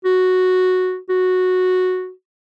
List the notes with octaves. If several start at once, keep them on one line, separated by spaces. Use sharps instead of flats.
F#4
F#4